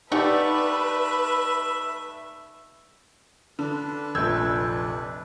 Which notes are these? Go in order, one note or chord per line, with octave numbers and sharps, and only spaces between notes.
G3 A3 D#4 G4 B4 D5 E5 F#5
D3 D4 B4
F1 A#1 E6 G6 G#6